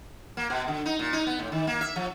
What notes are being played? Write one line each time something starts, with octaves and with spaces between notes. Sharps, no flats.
A#3
B2
D3
D#4
A#2
D#4
B3
A2
D#3
A#3
E5
F3